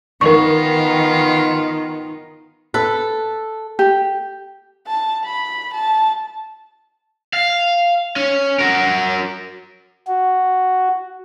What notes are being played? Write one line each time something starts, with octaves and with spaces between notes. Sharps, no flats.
D#3 B3 F4 A#4 C#6
A4 B4
G4
A5
B5
A5
F5
C#4
F#4 A#4
F#4